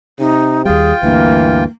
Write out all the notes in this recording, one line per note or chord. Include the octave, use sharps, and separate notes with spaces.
C3 D#4
D#2 G3 F4 G#4 G5
D2 G2 E3 A#3